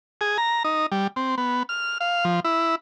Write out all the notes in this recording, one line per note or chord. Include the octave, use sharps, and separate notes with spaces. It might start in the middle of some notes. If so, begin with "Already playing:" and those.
G#4
A#5
D#4
G3
C4
B3
F6
F5
F3
E4